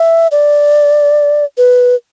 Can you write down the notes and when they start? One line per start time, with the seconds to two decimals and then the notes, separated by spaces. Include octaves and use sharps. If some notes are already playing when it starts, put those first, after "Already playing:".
Already playing: E5
0.31 D5
1.57 B4